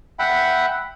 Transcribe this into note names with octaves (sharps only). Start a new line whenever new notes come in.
E5 F#5 G5 B5